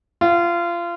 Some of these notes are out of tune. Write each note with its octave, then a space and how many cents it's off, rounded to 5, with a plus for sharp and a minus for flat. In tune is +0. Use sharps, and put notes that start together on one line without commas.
F4 -25 F#5 +0